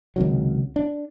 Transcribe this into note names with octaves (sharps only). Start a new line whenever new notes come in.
C#2 C3 D#3 F#3
D4